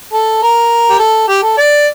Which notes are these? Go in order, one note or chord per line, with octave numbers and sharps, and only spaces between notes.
A4
A#4
G4
A4
G4
A4
D5